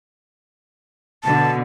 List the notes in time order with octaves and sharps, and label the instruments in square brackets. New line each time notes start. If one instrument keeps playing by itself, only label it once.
[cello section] B2 D3 [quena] A5